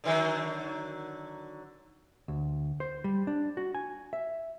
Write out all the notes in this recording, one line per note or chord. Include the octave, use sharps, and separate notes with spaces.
D3 D#3 F#3
D2
C5
G3
D4
F#4
G#5
E5